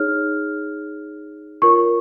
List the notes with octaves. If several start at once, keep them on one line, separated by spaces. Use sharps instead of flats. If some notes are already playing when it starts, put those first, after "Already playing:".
Already playing: D#4 G#4 C#5 F6
F4 A#4 C#5 C#6